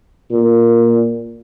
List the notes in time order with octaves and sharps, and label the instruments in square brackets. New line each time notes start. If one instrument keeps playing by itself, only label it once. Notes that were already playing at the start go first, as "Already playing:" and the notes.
[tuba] A#2